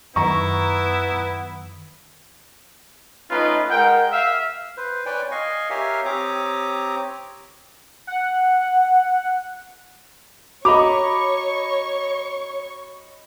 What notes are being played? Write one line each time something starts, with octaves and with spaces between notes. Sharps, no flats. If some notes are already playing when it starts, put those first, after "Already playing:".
F#2 D#3 B3 E4 A#5 C#6
A3 C#4 D#4 F4 B4 D#5
G#3 A#4 F#5 G5
E5 F5
B4 C5
B4 C#5 D5 G5 G#5
D#5 F5 G#5 C#6
G4 A#4 C#5 E5 F5 G#5
C4 G4 C#5 A#5 D6 D#6
F#5
F#4 C#5 D#5 A#5 B5 C#6 D6 F7